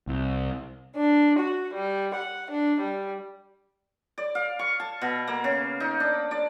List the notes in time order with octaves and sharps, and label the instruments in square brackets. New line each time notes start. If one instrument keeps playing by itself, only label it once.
[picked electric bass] C2
[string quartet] D4
F#4
G3
F#5
D4
G3
[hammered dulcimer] D5
F5
C#6
A5
B2
A#3
C#3
D#4
D4
D5